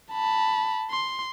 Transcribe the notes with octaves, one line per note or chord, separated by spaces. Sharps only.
A5 B5
C6